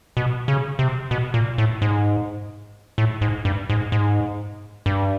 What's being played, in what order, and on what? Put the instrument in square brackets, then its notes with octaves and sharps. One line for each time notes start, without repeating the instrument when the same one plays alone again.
[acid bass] B2
C#3
C3
B2
A#2
A2
G#2
A2
G#2
G2
G#2
G#2
G2